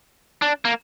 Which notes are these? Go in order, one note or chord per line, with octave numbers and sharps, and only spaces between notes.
D4
A#3